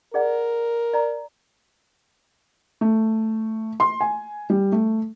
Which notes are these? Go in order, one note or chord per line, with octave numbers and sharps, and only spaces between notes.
G#4 A#4 D5 F#5
D5 A#5
A3
C6
G#5
G3
A3